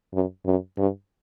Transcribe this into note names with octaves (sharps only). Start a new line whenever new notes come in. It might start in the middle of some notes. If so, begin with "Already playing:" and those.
F#2
F#2
G2